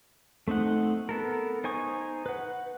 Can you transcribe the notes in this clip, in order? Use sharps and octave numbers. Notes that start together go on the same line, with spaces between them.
A3 C4 D#4 F#5
B3 A4 A#4
D#4 C5 G#5 C#6 D#6
B4 F#5